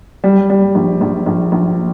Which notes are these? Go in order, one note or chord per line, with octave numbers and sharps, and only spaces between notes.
G3
G3
A#1
A#1
A#1
A#1